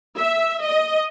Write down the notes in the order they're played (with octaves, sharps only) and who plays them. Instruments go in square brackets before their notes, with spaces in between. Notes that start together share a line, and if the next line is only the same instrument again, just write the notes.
[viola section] E5
D#5